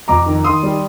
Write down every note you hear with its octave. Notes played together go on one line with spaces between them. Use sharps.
F2 A#5 D6
D#3
D#3 C6 D#6
G3